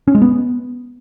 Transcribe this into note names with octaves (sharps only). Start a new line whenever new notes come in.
C#4
G#3
B3